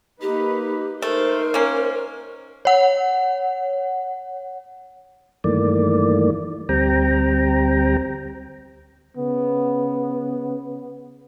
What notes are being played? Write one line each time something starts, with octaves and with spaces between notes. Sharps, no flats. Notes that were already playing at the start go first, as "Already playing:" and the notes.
A#3 D#4 G4 B4
A3 D#4 A#4 C5
A#3 C#4
C#5 F#5
G2 D#3 E3 A3 A#3 D5
D2 G3 C4 G5 A#5
C#3 B3